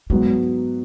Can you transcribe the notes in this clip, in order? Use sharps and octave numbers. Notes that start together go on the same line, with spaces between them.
G#2 F#3 G#3 B3 F#4